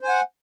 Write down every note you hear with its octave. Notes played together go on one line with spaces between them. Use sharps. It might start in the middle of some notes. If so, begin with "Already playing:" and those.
C5 F#5 G#5